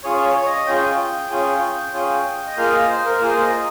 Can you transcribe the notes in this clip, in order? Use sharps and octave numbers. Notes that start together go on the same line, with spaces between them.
C#4 F4 G#4 C#5
C#5
C#5
D#5
C#4 F4 G#4 G5
C#4 F4 G#4
C#4 F4 G#4
D#5
A#3 F4 G#4 F5
D#5
C5
A#4
A#3 F4 G#4 C5
D#5